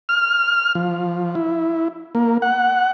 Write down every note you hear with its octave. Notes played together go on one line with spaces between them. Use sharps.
F6
F3
E4
A#3
F#5